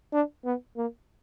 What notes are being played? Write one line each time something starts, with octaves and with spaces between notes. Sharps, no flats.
D4
B3
A#3